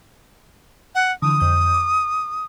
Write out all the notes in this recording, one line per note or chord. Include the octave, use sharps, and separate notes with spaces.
F#5
D3 E3 F3 D#6
F2 G6
D6